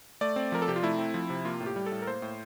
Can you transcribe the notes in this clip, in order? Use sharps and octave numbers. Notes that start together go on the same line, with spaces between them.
A3 D5
C4
F3 A#4
A4
C3 G4
F4
A3 E4
C4
F3
C3
A#3 F4
A2
G4
G3
A4
A2
A#4
A#3 C5
A2